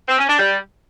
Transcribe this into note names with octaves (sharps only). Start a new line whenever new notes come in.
C4
C#4
D4
G3